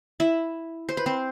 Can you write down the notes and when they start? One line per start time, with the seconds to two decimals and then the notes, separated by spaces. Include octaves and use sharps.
0.20 E4 E5
0.89 C5
0.97 B4
1.06 C4 C5